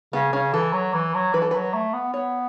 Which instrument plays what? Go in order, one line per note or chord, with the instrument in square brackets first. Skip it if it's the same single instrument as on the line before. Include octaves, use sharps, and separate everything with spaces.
[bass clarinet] C#3 [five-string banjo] B3
[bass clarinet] C#3 [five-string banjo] C#4
[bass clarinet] E3 [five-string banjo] A4
[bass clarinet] F#3
E3
F#3
[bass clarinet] E3 [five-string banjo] B4
[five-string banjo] A4
[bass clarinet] F#3 [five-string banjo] B4
[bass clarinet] A3
B3
[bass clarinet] B3 [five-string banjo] C#5